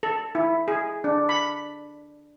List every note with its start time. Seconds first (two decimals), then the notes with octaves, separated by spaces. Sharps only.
0.03 A4
0.35 E4
0.68 G#4
1.04 D4
1.29 B5